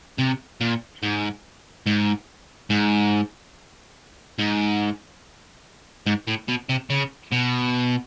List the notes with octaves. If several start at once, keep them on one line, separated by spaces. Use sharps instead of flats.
C3
A#2
G#2
G#2
G#2
G#2
G#2
A2
B2
C3
C#3
B2